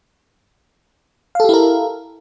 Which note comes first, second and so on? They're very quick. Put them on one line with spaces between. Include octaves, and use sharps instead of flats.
F5 A4 G4 E4 A#4